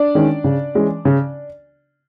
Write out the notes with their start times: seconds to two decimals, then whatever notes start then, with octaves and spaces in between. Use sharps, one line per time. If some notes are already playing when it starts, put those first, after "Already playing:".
Already playing: D4 D5
0.15 D#3 G#3 C#4
0.44 C#3
0.75 E3 G#3 C#4
1.05 C#3